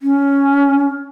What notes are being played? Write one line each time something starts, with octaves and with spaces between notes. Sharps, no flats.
C#4